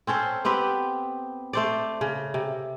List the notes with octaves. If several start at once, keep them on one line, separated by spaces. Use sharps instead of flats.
C4 C#4 A4 C5
B3 C4 G4 B4
A3 C5 D5
C#3
C3